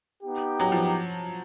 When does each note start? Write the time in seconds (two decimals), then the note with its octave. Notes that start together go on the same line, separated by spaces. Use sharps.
0.23 B3 D#4 G4
0.60 F#3
0.72 F3